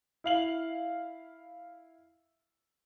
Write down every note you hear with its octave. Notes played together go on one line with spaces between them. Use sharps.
E4 F5 F#7